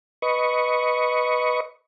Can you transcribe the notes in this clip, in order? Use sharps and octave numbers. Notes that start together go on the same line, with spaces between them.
B4 D#5 C#6